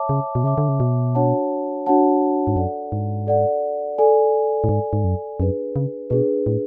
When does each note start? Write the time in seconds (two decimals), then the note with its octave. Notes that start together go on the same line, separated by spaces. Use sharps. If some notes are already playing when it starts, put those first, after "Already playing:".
Already playing: C#5 E5 A5 D6
0.09 C#3
0.35 B2
0.44 C#3 C#5 E5 A5 D6
0.58 D3
0.68 C#3
0.80 B2
1.15 D4 F#4 C#5 F#5 A5
1.86 D4 F#4 C#5 F#5 A5
2.47 G#2
2.56 F#2 A4 D5 F#5
2.92 G#2
3.27 A4 D5 F#5
3.98 A4 D5 G#5
4.64 A2
4.68 G#2 A4 D5 G#5
4.93 G#2
5.04 F#2
5.40 F#2 D4 G#4 B4
5.76 C#3
6.10 B2 D4 G#4 B4
6.46 A2